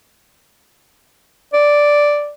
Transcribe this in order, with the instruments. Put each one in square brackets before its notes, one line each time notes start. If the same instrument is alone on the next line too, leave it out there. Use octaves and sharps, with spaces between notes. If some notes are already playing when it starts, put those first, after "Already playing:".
[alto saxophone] D5